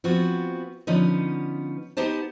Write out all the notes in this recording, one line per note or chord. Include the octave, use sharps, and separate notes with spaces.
F3 B3 C4 F#4
D3 F3 B3 C#4 D#4
B3 D#4 G4 C5 A5